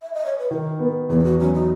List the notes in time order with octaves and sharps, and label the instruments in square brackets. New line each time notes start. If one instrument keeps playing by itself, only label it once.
[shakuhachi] E5
D#5
C#5
B4
[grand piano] D#3 [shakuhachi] A#4
[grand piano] B3
[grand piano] E2 [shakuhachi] G#4
[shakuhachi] E4
F#4
[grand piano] F#3 [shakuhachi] C#4
[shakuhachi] D#4